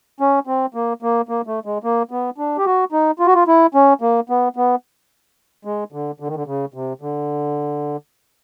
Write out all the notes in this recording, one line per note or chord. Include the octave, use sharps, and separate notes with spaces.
C#4
C4
A#3
A#3
A#3
A3
G#3
A#3
B3
D4
G4
F#4
D#4
F4
F#4
F4
E4
C#4
A#3
B3
B3
G#3
D3
D3
D#3
D3
C#3
C3
D3